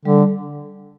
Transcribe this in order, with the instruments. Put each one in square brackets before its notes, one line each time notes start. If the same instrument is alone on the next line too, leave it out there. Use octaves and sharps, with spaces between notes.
[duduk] D3 [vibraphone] G3